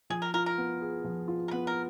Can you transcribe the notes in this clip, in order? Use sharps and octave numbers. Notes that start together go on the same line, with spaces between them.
F3 G#4
A#4
F4 A#4
A#4
B3
G#4
F3
F4
A#4
B3 B4
A#4